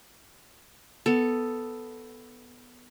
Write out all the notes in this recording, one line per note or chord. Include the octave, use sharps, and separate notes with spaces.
B3 A4